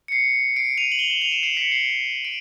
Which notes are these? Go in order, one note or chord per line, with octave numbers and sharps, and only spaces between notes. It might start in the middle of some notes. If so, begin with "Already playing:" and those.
C#7
C7
C7 D7
D#7 F7
F#7
F7 G7
E7 F#7
D#7 F7
D7 E7
C7 D7
B6 C#7
C7 D7
D7